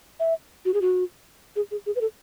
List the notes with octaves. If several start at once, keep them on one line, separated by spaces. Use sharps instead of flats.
E5
F#4
G#4
F#4
G#4
G#4
G#4
B4
A4